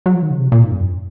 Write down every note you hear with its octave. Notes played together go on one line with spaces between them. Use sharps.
F#3
F3
D#3
C#3
C3
A#2
G#2
F2
F#2